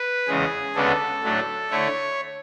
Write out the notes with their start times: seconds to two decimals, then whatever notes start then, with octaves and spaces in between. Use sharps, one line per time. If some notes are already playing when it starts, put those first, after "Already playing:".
Already playing: B4
0.28 E2 C#3 G#3 G#4
0.75 D2 C#3 G#3 B3 D4 A4
1.23 A2 F#3 A3 D4
1.70 D3 A3 E4 C#5